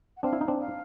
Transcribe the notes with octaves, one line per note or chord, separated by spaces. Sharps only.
F#5
C4 D4 F5
E4
D#4
C4 D4
F5